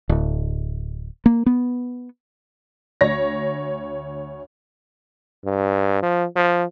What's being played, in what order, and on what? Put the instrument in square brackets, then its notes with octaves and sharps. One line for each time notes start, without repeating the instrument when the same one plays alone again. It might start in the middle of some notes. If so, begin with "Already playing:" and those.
[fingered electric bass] D1
A#3
B3
[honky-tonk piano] D2 C#5 A#6
[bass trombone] G2
F3
F3